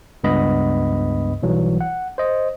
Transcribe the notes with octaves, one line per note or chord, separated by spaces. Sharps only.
C#2 G2 B3 D#5 B5
B1 E3 F#3 G3
F#5
C5 D#5